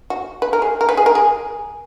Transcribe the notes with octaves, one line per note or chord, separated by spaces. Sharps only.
F#4
B4
A#4
G#4
A#4
B4
G#4
A#4
G#4